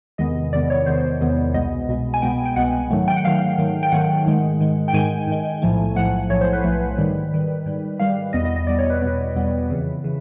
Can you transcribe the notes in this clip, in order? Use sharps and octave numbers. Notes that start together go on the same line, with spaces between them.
E2 C3 D#3 G#3 B3 D#5
E2 C3 D#3 G#3 B3 D5
C#5
E2 C3 D#3 G#3 B3 C5
E2 C3 D#3 G#3 B3
C2 B2 G#3 B3 D#5
C2 B2 G#3 B3
G#5
C2 B2 G#3 B3 G5
G5
C2 B2 G#3 B3 F#5
G#2 D#3 F#3 A3
G5
F#5
G#2 D#3 F#3 A3 F5
G#2 D#3 F#3 A3
G5
G#2 D#3 F#3 A3 F#5
G#2 D#3 G#3
G#2 D#3 G#3
G5
G#2 D#3 G#3 G#5
G#2 D#3 G#3
B1 A2 F3 A3
B1 A2 F3 A3 F#5
B1 A2 F3 A3 C#5
C5
B4
B1 A2 F3 A3
G#2 D#3 G3
G#2 D#3 G3
G#2 D#3 G3
G#2 D#3 G3 F5
E2 B2 G3 B3 D#5
D#5
D#5
E2 B2 G3 B3 D5
C#5
B4
E2 B2 G3 B3 B4
E2 B2 G3 B3
F2 C#3 E3
C#3 E3